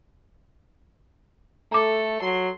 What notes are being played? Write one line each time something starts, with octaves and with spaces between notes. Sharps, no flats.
A3 A4 A#5 D6
F#3 C6